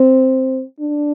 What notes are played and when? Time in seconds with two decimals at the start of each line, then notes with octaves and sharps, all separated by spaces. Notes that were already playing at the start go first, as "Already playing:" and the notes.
Already playing: C4
0.80 D4